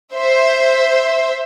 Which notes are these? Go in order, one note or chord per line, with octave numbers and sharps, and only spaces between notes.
C5 E5